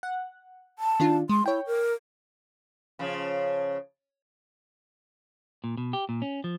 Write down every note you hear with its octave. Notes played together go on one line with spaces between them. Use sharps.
F#5
A5
D#3 D4 F4
G#3 C6
E4 C#5 G5
A#4
C#3 F3
A#2
B2
G4
A#2
C#4
F3